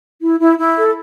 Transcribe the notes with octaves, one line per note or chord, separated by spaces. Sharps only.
E4
E4
E4
A4